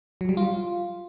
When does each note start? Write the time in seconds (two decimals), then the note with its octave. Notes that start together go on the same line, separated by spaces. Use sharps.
0.21 F#3
0.29 G3
0.37 F4